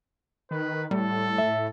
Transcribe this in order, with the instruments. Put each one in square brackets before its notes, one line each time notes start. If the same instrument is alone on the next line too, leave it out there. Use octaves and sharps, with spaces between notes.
[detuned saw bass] D#3 [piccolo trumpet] B4
[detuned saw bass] A2 [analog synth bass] G3 [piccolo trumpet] A4
[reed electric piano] E5